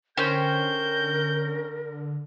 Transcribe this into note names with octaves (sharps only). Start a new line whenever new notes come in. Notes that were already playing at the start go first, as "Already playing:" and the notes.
D3 C#4 A#4 C5 G5 G6